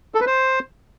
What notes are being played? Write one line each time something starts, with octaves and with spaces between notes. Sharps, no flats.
A4
B4
C5